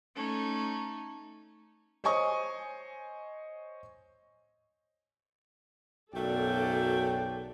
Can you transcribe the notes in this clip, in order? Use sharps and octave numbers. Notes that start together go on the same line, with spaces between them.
A3 C#4 D#4 A4
C5 C#5 D#5 G#5 C#6 D#6
B1 F#2 C#3 A3 F#4 A4 D5 G5